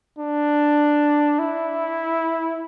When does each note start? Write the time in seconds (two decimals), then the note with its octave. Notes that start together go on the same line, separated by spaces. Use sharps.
0.19 D4
1.39 E4